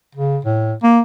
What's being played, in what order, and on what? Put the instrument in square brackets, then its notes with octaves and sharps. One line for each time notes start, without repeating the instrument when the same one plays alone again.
[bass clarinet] C#3
A2
A#3